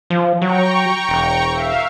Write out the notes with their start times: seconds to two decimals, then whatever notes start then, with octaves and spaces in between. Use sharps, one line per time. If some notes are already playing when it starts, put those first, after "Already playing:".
0.10 F3
0.42 F#3 G5 A#5 C#6
1.09 E1
1.52 E5 F5